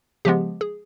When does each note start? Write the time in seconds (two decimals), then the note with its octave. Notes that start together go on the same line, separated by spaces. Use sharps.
0.25 C#3 F3 G#3 B3 G4
0.61 G#4